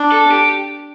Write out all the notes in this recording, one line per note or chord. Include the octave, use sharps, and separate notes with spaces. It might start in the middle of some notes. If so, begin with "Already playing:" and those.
Already playing: D4
A4
G4